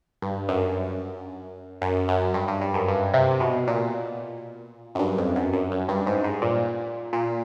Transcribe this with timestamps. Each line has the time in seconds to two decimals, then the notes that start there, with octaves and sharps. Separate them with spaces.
0.22 G2
0.49 F#2
1.82 F#2
2.08 F#2
2.34 G2
2.48 G2
2.61 G2
2.74 F#2
2.88 G2
3.14 C3
3.40 B2
3.68 A#2
4.95 F#2
5.00 G2
5.18 F2
5.36 F#2
5.53 F#2
5.71 F#2
5.89 G2
6.07 G#2
6.24 G#2
6.42 A#2
7.13 A#2